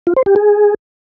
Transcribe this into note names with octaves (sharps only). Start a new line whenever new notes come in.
F4
C5
G4
G#4